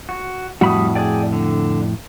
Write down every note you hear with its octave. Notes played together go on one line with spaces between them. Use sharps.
F#4
F2 A2 G3 F#4 B5 D#6
G#4 D5 G5
D3